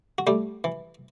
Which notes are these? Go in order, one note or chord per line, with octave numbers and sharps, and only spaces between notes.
F#4
G3 A3 G4
E3